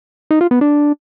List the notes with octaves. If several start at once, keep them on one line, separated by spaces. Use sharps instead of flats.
D#4
F4
B3
D4